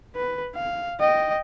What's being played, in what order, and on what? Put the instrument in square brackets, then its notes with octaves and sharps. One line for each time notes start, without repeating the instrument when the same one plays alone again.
[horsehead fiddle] B4
F5
D#5 G5